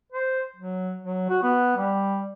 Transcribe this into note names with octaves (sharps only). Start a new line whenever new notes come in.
C5
F#3
F#3
F#4
B3
G3